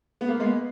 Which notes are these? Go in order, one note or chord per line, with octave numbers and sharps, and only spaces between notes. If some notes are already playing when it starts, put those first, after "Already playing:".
B3
A#3
G#3 B3